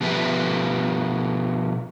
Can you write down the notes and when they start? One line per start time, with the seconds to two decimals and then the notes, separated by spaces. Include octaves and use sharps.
0.01 B2 F3 G4 B4 E5